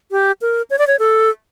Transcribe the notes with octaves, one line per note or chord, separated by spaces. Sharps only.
G4
A#4
C#5
D5
C#5
A4